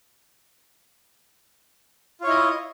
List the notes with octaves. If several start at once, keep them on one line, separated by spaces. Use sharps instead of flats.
E4 F4 C#5 D#5